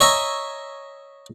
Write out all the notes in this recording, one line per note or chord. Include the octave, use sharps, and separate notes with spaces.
C#5 D#5 E5 G#5 A#5